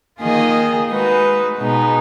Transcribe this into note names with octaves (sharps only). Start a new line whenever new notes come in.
D#3 A#3 F4 G#4 D#5
G#3 D#4 F#4 B4
B2 G#3 B3 D#4